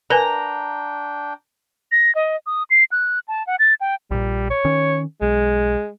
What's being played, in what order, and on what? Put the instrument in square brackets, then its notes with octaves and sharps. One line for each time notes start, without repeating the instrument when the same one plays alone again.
[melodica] D4 G5 [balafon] A#4 B4 G#5 [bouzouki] A#5
[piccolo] A#6
D#5
D#6
C7
F#6
A5
F#5
A6
G5
[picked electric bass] A#1 A#2 [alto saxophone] G3
[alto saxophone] C#5
[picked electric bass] D#3 C#4
[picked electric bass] B1 [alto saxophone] G#3